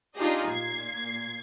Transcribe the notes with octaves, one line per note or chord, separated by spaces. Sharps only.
D4 D#4 F4 G4 G#4 D#5
A#2 G#6 C7